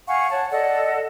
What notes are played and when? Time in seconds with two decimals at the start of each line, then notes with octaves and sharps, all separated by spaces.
0.08 F5 F#5 G#5 C#6
0.31 C#5 F#5 A5
0.51 A4 D5 D#5 F#5